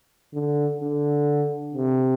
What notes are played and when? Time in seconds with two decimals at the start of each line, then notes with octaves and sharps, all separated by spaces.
0.34 D3
0.81 D3
1.74 C3